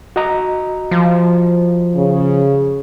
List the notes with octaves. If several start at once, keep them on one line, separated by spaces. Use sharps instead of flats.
F#4 D#5 A#5
F3
C#3